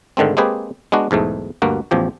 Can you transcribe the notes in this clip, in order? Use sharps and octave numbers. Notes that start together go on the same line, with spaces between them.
G#2 D3 D#3 A3 C4
G#3 A#3 C4 G4 G#4 B4
G#3 B3 D4 F#4
B1 E2 G#2 A3
D2 G2 A#3 F#4
A1 E2 F3 G4